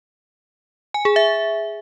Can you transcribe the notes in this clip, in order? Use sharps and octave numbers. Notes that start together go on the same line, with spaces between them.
G#5
G#4
E5